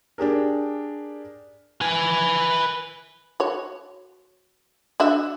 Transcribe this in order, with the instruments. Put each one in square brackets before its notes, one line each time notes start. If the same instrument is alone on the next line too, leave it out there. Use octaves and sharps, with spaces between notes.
[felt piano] D4 G4 G#4 A#4
[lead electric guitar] B4 G#5
[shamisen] F#4 C#5
D4 F#4 E5